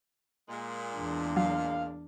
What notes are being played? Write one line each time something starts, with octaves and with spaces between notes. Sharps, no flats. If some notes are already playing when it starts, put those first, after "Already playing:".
A#2 G#3
E2 D4
F#3 F5